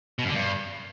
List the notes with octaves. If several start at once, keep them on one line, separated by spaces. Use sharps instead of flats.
B2
F#2
D3
G2